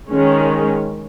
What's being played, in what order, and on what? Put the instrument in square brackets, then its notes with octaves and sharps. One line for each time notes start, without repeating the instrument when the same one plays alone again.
[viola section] D#3 G#3 C#4